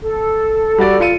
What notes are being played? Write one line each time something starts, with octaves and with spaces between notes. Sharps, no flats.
A4
G3 F#4 D5
F4 C#7 D#7